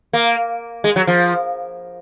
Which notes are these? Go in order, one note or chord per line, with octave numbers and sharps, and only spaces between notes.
A#3
G#3
F#3
F3